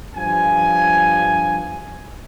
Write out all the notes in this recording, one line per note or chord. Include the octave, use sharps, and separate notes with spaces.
G2 F3 G#5